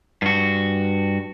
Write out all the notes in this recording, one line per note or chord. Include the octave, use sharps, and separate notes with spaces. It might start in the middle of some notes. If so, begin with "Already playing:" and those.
G2 F#4